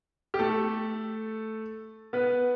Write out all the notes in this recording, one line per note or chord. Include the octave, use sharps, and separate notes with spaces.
G4
A3 A4
B3 B4